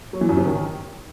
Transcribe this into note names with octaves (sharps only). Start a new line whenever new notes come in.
F#3
E3
F#2
C3
D#3